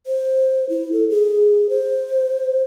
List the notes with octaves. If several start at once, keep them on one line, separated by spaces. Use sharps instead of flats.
C5
E4
A4
G#4
C5